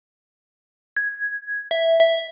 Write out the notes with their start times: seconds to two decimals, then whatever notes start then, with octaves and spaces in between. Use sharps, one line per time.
0.97 G#6
1.71 E5
2.00 E5